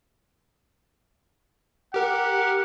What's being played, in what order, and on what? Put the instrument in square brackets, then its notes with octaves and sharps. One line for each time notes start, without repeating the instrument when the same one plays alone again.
[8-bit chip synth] G4 A#4 [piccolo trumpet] F#5